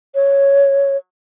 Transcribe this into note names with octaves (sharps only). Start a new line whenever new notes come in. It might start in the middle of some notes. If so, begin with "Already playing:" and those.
C#5